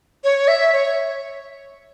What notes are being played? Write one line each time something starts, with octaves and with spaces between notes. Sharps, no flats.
C#5
E5
C#5